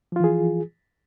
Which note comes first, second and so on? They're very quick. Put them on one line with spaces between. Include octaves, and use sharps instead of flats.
F3 F4 E3 G#4